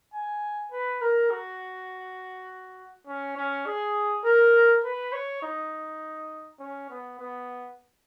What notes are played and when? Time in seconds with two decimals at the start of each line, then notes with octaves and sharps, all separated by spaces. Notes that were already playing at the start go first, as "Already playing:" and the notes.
0.13 G#5
0.71 B4
1.01 A#4
1.30 F#4
3.07 C#4
3.37 C#4
3.66 G#4
4.24 A#4
4.84 B4
5.13 C#5
5.43 D#4
6.59 C#4
6.90 B3
7.19 B3